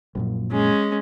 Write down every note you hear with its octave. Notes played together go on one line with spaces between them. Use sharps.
A#1 F#2 A#2
G#3 C#4